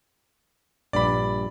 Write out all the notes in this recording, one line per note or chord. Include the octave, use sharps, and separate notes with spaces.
A#1 G2 G3 D5 B5